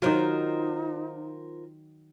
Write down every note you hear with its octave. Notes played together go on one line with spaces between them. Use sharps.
D#3 F#3 D#4 F4 A#4 C5